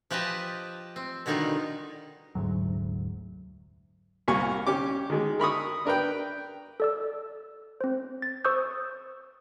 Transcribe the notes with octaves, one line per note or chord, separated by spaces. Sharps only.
F3 G4 B4 D#5 A5
C4
B2 D3 D#3 G3 D#4 F4
F1 D2 G#2 F#3
C2 A#3 G#5 C#6
C#4 G4 D6
D#3 G#3
A#4 B5 C#6 D#6
D4 A#4 B4 G5
A4 D5 E6
C4 C5
A6
C5 C#6 D#6 E6 G6